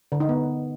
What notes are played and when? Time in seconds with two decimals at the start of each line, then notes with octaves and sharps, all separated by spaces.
0.12 D3
0.20 D#4
0.29 B3